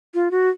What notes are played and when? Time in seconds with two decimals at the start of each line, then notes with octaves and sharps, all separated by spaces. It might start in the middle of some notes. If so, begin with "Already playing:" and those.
0.14 F4
0.31 F#4